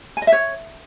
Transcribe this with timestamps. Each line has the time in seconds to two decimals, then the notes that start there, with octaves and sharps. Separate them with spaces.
0.17 G#5
0.22 D#5
0.27 E5
0.32 C#5